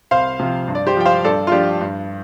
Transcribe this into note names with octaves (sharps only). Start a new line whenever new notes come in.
C2 C5 F5
C3 F3
G2
D5
G4 C5
F3 G5
C5 F5
G2 A4 D5
F4
F3 D4 G4
G2